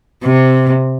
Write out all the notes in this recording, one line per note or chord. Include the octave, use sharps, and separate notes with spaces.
C3